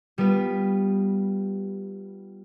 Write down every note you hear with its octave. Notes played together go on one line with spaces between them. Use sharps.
G3 B3 F4 B4